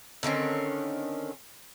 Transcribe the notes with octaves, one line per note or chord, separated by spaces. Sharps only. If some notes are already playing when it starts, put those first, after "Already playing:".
D3 D#3 C4 C#4